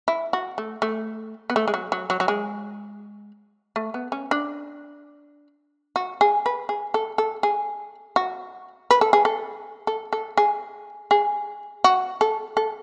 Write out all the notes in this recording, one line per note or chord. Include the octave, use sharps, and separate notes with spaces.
E4
F#4
A3
A3
B3
A3
G#3
F#3
F#3
F#3
F#3
G#3
A3
B3
C#4
D4
F#4
G#4
B4
G#4
A4
A4
G#4
F#4
B4
A4
G#4
A4
A4
A4
G#4
G#4
F#4
A4
A4